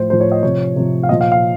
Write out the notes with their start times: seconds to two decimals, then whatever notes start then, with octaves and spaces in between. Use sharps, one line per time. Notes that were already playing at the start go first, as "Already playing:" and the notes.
Already playing: A2 F3 C5
0.10 A2 F3 C5
0.20 C#5
0.32 D#5
0.43 C3 F3 C#5
0.76 C3 F3
1.03 F5
1.09 A#2 F3 D#5
1.21 F5
1.32 F5